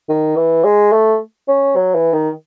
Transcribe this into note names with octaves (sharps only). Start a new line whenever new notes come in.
D#3
E3
G#3
A3
C#4
F#3
E3
D#3